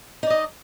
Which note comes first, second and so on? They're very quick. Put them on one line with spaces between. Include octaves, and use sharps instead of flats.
D#4 D5 D#5